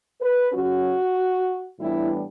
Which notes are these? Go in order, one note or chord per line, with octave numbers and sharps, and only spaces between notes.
B4
C#3 F#3 C#4 F#4
A2 E3 G3 B3 D4 E4